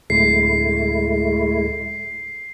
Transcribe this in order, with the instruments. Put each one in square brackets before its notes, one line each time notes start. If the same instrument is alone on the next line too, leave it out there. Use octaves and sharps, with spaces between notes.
[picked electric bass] D1 [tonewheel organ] G#3 A3 E4 [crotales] C7